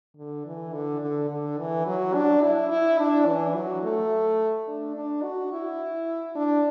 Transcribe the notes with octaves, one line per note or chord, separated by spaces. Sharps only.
D3
E3
D3
D3
D3
E3
F#3
D4
E4
E4
D4
E3
F#3
A3
D4
D4
F#4
E4
D4